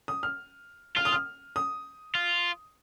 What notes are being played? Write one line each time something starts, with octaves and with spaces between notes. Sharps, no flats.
D#6
F6
F4 F6
D#6
F6
D#6
F4